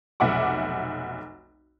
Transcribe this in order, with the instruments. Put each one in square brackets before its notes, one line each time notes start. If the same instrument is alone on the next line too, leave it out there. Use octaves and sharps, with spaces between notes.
[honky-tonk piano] F1 B1 E5 F#5 D6